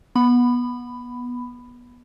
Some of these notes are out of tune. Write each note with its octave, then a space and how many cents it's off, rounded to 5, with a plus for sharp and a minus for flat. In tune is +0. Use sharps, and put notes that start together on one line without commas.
B3 -20 B5 +10